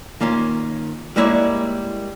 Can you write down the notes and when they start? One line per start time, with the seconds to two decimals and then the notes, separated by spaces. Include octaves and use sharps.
0.21 D#3 A#3 C#4 F4
1.16 G3 G#3 A#3 E4 C#5 D5